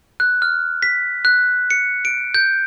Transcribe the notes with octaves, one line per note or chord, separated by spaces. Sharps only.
F#6
F6
B6
F#6
C#7
D7
G6